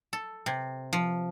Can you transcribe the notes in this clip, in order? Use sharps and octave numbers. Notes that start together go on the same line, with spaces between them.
A4
C3
F3